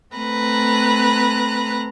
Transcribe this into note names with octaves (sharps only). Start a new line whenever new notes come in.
A3 C4 B4 A#5 F#6